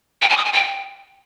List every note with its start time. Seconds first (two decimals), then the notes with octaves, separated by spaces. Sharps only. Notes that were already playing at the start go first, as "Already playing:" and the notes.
0.22 G5
0.30 G#5
0.37 D#6
0.45 G#5
0.53 G5